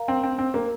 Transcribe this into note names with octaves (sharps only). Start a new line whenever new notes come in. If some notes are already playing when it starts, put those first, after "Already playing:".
Already playing: A#4 F5 A#5
C4
C4
C4
A#3